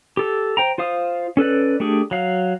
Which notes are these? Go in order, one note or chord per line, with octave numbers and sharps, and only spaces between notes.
G4 A4
C5 G5 A#5
F4 C5 F5 D#6
C#4 A4 B4 D5
A3 D4 G4 G#4
F#3 F5